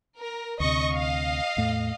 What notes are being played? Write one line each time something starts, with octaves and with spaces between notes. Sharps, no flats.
A#4
D2 C3 D#5 C#6
D#5 F5
E2 A2 A3